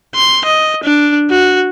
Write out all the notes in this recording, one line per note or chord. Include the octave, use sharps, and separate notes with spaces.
C6
D#5
D4
F#4